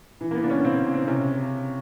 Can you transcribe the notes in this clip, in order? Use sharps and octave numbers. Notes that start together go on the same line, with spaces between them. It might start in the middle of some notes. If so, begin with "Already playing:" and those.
E3
A#3
B3
C#3 D4
C#4
C#3 C4
C#3
C4
C3 C#4